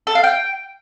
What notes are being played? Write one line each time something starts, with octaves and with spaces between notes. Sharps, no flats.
A4
F5
G5